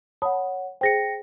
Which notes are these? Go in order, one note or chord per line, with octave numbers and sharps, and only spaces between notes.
C#5 F#5 A5 B5 D#6
G#4 C5 G5 A#6 C#7